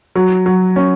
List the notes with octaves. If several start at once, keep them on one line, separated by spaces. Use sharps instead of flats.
F#3
F#3
C#4